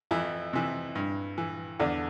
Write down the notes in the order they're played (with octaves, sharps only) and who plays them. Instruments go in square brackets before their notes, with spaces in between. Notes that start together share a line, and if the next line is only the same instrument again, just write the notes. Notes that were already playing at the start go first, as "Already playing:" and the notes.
[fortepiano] F2 E3 E4
C3 E3
G2
E3
E2 D3 D4